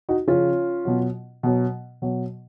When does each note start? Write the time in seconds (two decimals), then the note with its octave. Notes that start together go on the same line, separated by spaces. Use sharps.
0.09 D#4 F#4
0.27 C#3 F3 C#4 F4
0.85 B2 F#3
1.43 B2 F#3
2.02 B2 F#3